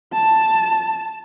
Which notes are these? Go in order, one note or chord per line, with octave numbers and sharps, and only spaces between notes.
A5